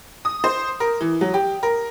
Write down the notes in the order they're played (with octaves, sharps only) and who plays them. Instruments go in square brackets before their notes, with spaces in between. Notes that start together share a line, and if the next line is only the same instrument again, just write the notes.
[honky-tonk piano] D#6
C5
A#4
E3
F#3
G4
A#4